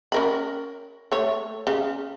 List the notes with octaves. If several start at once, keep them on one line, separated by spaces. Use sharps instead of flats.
C#4 A#4 B5
A3 C#5
C#3